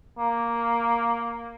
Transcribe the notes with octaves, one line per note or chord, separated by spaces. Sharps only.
A#3